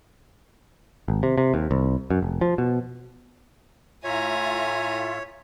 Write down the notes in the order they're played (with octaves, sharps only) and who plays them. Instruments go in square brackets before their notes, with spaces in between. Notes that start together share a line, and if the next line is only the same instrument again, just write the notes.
[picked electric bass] G#1
C3
C3
D#2
C2
F#2
F1
F3
B2
[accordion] A2 F4 E5 [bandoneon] C#5 [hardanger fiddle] G#5 A#5